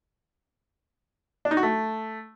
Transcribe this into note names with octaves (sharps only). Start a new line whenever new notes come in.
D4
D#4
F#4
A3